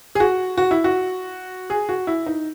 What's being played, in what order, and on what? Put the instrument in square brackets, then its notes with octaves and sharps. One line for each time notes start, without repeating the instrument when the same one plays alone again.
[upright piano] G#4
F#4
F#4
E4
F#4
G#4
F#4
E4
D#4